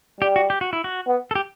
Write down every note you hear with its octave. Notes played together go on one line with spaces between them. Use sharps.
G3 G4
F#4
G4
F#4
E4
F#4
B3
A4
G4